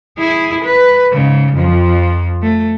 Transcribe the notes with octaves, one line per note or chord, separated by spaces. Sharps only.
E4 G#4
B4
G#2 C#3
F2 F3
A3